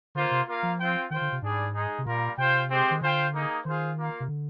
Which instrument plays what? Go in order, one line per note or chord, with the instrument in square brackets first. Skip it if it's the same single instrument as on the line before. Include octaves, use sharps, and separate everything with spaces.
[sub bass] D3 [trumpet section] A#3 F4 C5
[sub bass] C3
[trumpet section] A#3 F4 A#4 F5
[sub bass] F3
[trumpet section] C4 F4 C5 G5
[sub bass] D#3 [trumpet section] F4 C5 G5
[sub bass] D3
C3
[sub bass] G#2 [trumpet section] G3 D4 G#4
[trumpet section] G#3 D#4 G#4
[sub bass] C3
[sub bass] A#2 [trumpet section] G3 A#3 F4 A#4
[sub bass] C3 [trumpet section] F4 C5 G5
[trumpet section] G#3 C4 G4 C5
[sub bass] D#3
[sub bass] D3 [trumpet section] F4 C5 G5
[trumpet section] A#3 D#4 G#4
[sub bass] D#3 [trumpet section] F4 G#4 C5
[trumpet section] A#3 F4 A#4 F5
[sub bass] C3
D3